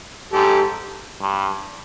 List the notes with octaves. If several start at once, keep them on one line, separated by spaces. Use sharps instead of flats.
G#2 G4 A4
G2